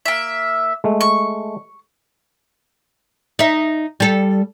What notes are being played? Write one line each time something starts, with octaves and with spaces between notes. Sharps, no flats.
A#3 E5
G#3 A3
C#6
D#4 E5
G3 A4